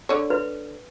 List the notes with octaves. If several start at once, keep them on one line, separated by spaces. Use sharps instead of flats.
D3 C#5
B4